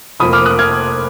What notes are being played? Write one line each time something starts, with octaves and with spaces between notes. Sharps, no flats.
F1 F2 F3 A#3 B5 D#6
D6 F6
D#6 F#6
F6 G#6